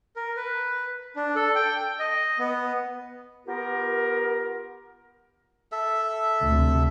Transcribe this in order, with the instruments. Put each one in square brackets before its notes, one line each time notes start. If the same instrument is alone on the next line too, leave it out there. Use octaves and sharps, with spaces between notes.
[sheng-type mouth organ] A#4
B4
D4
A4
G5
D#5
B3
[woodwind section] B3 F4 G4 A#4
[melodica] A4 E5
[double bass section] D2 C3